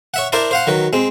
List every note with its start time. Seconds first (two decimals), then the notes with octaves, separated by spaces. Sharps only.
0.14 C#5 E5 F#5
0.32 D4 E4 A#4 C5 D5
0.51 C5 F5 F#5
0.67 D#3 F#3 B4
0.93 G#3 C4